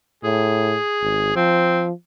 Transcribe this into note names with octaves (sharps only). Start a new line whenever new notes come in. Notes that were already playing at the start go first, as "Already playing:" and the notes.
A2 G#4
G#1
F3 C4